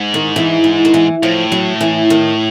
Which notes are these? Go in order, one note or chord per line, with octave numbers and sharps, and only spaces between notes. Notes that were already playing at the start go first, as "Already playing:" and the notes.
Already playing: G#2
D#3
E3
E3
D#3
E3
A2 F3
F#3
E3
D#3